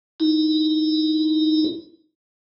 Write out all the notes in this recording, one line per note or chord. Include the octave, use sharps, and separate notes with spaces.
D#4 E4